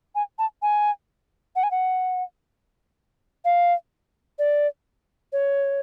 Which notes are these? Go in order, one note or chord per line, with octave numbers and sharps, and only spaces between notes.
G#5
A5
G#5
F#5
G#5
F#5
F5
D5
C#5